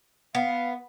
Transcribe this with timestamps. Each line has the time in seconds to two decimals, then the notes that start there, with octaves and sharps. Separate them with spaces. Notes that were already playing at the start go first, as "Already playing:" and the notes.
0.35 B3 F5